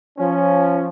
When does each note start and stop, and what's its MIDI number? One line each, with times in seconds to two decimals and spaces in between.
0.18 0.86 53
0.18 0.86 61